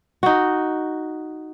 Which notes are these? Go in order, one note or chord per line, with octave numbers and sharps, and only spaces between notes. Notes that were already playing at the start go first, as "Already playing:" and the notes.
D#4 F#4